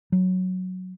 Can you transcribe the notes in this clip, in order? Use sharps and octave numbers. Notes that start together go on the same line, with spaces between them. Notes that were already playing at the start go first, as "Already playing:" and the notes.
F#3